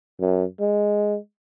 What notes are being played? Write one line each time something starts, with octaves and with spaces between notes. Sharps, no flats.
F#2
G#3